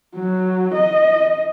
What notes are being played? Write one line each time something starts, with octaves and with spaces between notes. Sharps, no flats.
F#3
D#5